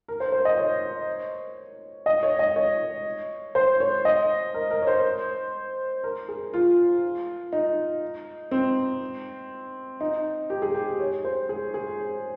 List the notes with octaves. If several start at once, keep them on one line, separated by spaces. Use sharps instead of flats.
A#4
C5
C5
D#5
C#5
D#5
C#5
D#5
C#5
C5
C#5
D#5
A#4
A#4
C#5
C5
A#4
G#4
F4
D#4
C4
D#4
G4
G#4
G4
C#5
C5
G#4
G#4